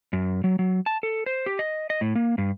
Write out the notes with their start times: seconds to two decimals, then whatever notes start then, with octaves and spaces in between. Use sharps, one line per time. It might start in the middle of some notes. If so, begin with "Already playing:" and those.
0.13 F#2
0.44 F#3
0.59 F#3
0.86 A5
1.03 A4
1.26 C5
1.46 G4
1.59 D#5
1.90 D#5
2.01 A2
2.15 A#3
2.38 G2